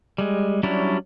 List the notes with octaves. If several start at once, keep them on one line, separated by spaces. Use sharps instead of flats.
G3 G#3
F#3 G3 C#4 D4 E4